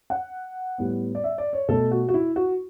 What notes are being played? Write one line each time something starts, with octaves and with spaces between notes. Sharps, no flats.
F#5
A2 G3 B3
D5
E5
D5
C#5
B2 A3 A4
F#4
F#4
E4
F#4